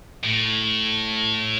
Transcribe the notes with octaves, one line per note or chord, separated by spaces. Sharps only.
A2